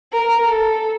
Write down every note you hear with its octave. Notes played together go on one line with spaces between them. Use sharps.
A#4
A4